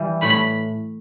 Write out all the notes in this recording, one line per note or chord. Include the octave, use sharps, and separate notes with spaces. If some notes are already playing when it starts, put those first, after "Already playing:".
Already playing: E3 G3
A2 B5